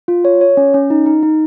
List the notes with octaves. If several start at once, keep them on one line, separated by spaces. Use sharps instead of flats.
F4
C#5
C#5
C#4
C#4
D#4
D#4
D#4